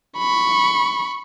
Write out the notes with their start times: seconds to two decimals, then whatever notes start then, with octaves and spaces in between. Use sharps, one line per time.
0.18 B5 C#6